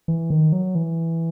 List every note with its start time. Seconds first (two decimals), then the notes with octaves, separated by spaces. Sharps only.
0.08 E3
0.30 D#3
0.53 F#3
0.75 E3